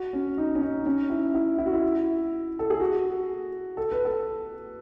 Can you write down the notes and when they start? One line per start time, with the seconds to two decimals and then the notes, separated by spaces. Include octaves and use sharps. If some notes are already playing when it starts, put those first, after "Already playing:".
Already playing: F#4
0.13 C#4
0.38 D#4
0.55 C#4
0.62 D#4
0.86 C#4
1.10 E4
1.34 E4
1.58 E4
1.66 F#4
1.73 E4
2.59 A4
2.70 G#4
2.80 F#4
3.77 A4
3.92 B4
4.05 A4